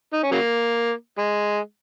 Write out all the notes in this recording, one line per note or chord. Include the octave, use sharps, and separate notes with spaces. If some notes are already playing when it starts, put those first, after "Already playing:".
D#4
C#4
C#3 F#3 A#3
G#3